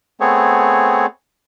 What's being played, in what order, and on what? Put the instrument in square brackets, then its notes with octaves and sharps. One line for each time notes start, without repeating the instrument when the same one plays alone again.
[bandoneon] A3 B3 C4 G#4 C#5